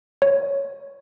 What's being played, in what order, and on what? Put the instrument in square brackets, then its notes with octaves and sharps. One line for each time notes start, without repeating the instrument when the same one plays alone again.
[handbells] C#5